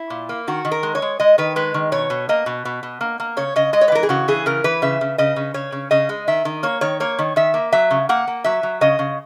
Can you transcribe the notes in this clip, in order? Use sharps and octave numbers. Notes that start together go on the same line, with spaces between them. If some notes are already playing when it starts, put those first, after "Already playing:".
Already playing: E4
A#2
A#3
D#3 F#4
D#3
A#4
G#3
C#5
G#3
G#3 D#5
D#3 B4
G#3 B4
D#3
B2 C#5
B2
A#3 D#5
B2
B2
B2
A#3
A#3
C#3 C#5
C#3 D#5
G#3 D#5
C#5
B4
E3 A#4
G#4
C#3 F#4
E3 G#4
C#3 A#4
E3 B4
C#3 E5
C#3
C#3 D#5
C#3
C#3 C#5
C#3
C#3 D#5
G#3
D#3 E5
D#3
A#3 C#5
D#3 C#5
A#3 C#5
D#3
D#3 E5
A#3
F#3 E5
C#3
A#3 F#5
A#3
F#3 E5
F#3
C#3 D#5
C#3